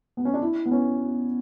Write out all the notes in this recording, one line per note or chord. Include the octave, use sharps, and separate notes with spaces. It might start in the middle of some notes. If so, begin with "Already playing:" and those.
B3
C#4
D4
E4
B3
C#4